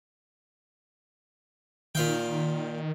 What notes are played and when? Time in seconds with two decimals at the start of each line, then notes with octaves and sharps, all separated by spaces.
1.95 A#2 D#3 F5 G5